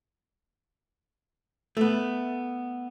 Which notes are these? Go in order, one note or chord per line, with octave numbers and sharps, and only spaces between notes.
A3 B3